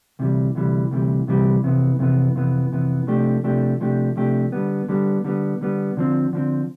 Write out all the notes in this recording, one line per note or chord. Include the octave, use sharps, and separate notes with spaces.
D2 C3 E3 G3
D2 C3 E3 G3
D2 C3 E3 G3
D2 C3 E3 G3
F2 C3 E3 B3
F2 C3 E3 B3
F2 C3 E3 B3
F2 C3 E3 B3
C3 F3 A3 D4 G4
C3 F3 A3 D4 G4
C3 F3 A3 D4 G4
C3 F3 A3 D4 G4
D3 G3 B3
D3 G3 B3
D3 G3 B3
D3 G3 B3
D3 F3 C4
D3 F3 C4